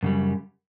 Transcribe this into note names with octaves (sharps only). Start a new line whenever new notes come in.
F#2 C#3 G3